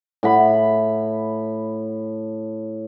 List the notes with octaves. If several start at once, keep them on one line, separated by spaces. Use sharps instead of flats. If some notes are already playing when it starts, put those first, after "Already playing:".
A2 F#5 B5